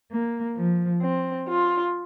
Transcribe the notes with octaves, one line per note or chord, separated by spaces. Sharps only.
A#3
F3
C4
F4